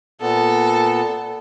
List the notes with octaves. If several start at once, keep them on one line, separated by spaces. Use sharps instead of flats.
A#2 B3 A4